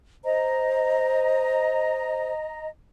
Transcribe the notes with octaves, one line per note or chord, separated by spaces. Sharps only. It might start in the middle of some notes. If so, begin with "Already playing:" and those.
C5 D#5 A#5